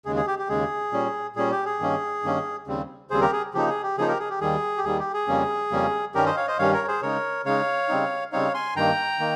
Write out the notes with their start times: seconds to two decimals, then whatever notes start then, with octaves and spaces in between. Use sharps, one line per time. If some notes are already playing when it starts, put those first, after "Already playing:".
0.05 D#2 C#3 G#3 G#4
0.16 G#4
0.27 G4
0.39 G4
0.49 D#2 C#3 G#3 G#4
0.92 A#2 G3 C#4
1.36 A#2 G3 C#4 G#4
1.51 G4
1.65 G#4
1.80 G2 D#3 A#3 C#4
2.23 G2 D#3 A#3 C#4
2.67 D#2 C#3 G3 C4
3.10 D#2 C#3 G3 C4 G#4 C5
3.21 G4 A#4
3.32 G#4
3.54 C#3 F3 A#3 D#4 G4
3.69 G#4
3.83 G4
3.97 C#3 F3 A#3 D#4 G#4
4.08 G4 A#4
4.19 G#4
4.30 G4
4.41 D#2 D#3 G3 G#4
4.77 G4
4.84 D#2 D#3 G3 G#4
4.99 G4
5.14 G#4
5.28 F2 C#3 G3 A#3 C#4
5.71 F2 C#3 G3 A#3 C#4
6.14 G2 D#3 G3 C#4 G4 A#4
6.26 C5 D#5
6.36 C#5 F5
6.47 C5 D#5
6.58 G2 D#3 G3 C#4 C#5 F5
6.73 A#4 C#5
6.88 G#4 C5
7.02 C#3 G#3 D#4 A#4 C#5
7.45 C#3 G#3 D#4 C#5 F5
7.89 C#3 G3 C4 D#4
8.32 C#3 G3 C4 D#4 C#5 F5
8.54 G#5 C6
8.76 G2 D#3 A#3 G5 A#5
9.20 D#3 A#3